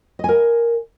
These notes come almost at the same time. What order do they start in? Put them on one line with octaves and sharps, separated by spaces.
D#5 G#5 A#4